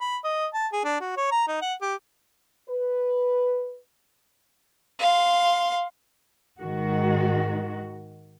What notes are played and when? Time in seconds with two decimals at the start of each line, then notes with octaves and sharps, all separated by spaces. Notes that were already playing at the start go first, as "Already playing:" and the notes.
0.01 B5
0.24 D#5
0.54 A5
0.73 G#4
0.84 D4
1.01 F#4
1.17 C#5
1.32 A#5
1.48 D#4
1.62 F#5
1.82 G4
2.69 B4
4.99 F5 C6
6.60 G#2 D#3 F#4